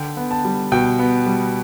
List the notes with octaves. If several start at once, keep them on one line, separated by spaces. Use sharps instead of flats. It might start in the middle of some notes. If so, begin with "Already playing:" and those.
Already playing: D3 G5
B3
A5
G3
B2 G5
B3
G3